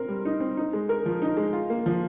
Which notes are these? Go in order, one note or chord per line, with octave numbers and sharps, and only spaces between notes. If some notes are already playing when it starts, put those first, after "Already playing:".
Already playing: C4 A#4
G3
D#4
C4
D#4
G#3
A#4
F3
D#4
G#3
F4
A#3
F3